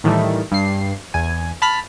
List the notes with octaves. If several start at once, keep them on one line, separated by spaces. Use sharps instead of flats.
A2 D#3 E3 G3 A3
G2 C7
E2 G#5
A5 B5 F6 B6